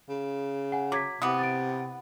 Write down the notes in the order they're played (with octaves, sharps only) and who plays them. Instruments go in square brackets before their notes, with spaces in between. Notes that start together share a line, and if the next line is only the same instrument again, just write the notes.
[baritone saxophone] C#3
[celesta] F#5 G#5
[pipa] F#3 [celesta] D6 G#6 B6
[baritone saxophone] C3 [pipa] E3 B3 [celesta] F#5 D6 D#6
[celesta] A6 D7